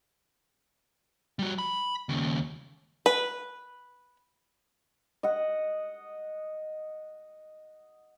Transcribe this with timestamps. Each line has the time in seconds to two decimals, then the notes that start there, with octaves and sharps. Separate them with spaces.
1.39 G3 F#4
1.58 B5
2.09 D#2 C#3
3.06 B4
5.23 D#5 F#5